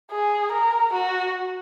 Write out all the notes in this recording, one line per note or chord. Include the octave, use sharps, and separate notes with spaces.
G#4
A#4
F#4